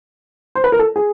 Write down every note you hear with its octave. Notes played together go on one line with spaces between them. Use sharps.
C5
B4
A#4
A4
G#4